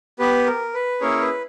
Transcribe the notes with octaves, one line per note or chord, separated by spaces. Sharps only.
B3 G4 B4
A#4
B4
A#3 C#4 E4 G#4 A#4 C#5
B4